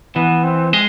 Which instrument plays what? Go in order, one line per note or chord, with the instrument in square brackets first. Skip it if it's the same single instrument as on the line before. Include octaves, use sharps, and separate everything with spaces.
[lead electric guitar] E3 [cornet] B3
[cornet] C4
[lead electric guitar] G#3